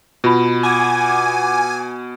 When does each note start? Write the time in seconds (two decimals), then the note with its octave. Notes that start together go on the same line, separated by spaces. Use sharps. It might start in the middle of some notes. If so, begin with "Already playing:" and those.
0.24 B2 F4 B5
0.63 F#5 G#5 D6